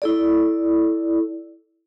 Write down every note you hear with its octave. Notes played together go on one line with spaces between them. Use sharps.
E4 A4 D5